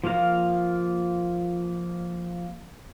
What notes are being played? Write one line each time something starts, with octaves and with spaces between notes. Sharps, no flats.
F3 A#3 F4 F5 A#5